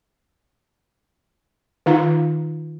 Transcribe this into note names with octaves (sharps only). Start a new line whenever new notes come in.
D#3 D#4 F4 F5 A#5